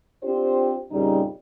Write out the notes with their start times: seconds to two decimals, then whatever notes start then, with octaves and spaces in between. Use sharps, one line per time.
0.23 C4 D4 F4 G4 C5
0.91 F2 A#2 C#3 G3 D#4